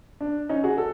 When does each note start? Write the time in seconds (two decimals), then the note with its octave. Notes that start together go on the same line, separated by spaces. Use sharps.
0.21 D4
0.49 C#4 D#4
0.64 F#4 G#4
0.78 A4